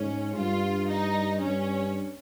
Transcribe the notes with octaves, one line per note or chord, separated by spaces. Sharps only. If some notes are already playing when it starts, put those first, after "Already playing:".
Already playing: G#2 C#4
G2 F4
D#4
G2 C#4